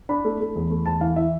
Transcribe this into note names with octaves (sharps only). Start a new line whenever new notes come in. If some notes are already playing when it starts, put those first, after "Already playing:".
D4 B5
A3
A3
E2
A3
E2 A5
E3 F5
E3 E5